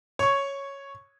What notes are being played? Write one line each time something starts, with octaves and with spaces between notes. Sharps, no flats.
C#5 C#6